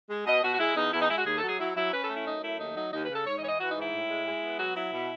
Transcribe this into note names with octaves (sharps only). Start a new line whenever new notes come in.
G#3
B2 D#5
B2 F#4
F#4
G#3 E4
E2 D#4
E2 E4
D#4
G#3 E4
F#4
D#2 G#4
A4
F#3 G#4
F#3 E4
F#3 E4
C#4 B4
A4
A3
E4
F#2 D#4
A3 E4
D#2 D#4
F#3 D#4
D#2 D#4
B4
C#3
A4
G#2 C#5
D#5
E3 C#5
D#5
E3 F#4
D#4
G#2
E4
A2
G#3
G#3
B3
F#3 F#4
F#3 E4
B2